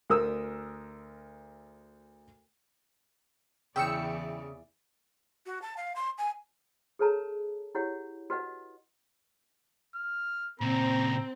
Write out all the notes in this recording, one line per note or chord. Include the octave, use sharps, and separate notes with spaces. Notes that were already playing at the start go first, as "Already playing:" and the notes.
D2 A#4 D#6 E6
E2 C#3 E3 D5 G5 E6 C#7
F#4
A5
F5
C6
G#5
G#4 A4 B4 C#5 A5 A#5
E4 G4 C#5 F#5
F#4 B4 D#5 F#5
F6
A#2 C#3 C4 A#5